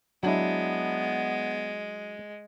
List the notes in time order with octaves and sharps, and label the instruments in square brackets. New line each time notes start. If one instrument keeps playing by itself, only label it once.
[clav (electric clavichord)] F#3 D4 E4 [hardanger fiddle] G#3 [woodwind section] B3